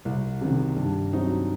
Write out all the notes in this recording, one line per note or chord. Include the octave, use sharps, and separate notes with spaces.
C2
C3 D#3
G2
F#3 C4 D#4 F#4